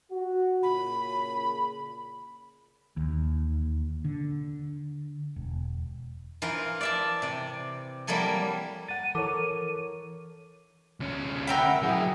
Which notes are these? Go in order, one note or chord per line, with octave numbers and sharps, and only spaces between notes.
F#4
A#2 C#3 B5
D#2
D3
E1
E3 F4 A#4 C5
D5 E5 A5
C3 D5
F#3 G3 A#3 E4 A4 G#5
F#5 A6 D#7
E3 A4 A#4 C#5 D6
D2 C#4
A#4 E5 F#5 G5 B5
F#3 E4 G#4